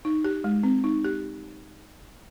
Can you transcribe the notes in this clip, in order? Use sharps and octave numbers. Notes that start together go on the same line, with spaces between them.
D#4
G4
G#3
C4
D#4
G4